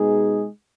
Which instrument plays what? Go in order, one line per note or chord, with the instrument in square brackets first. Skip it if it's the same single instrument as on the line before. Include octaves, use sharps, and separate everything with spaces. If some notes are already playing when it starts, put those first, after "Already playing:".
Already playing: [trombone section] B2 G#3 D#4 G#4